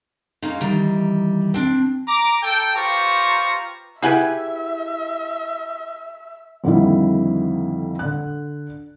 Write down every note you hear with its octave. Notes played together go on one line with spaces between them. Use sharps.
G#3 A#3 C#4 D#4
D#3 E3 G3 A#5
C4 D4
A#5 D6
A4 G5
F4 G4 B4 C5 A#5 C#6
E4 G4 G#4 B4 E5 F#5 G#5
F2 D3 D#3 G3 A#3 E4
D3 F#6